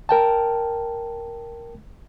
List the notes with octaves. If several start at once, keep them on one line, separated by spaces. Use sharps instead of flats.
A#4 G5 A5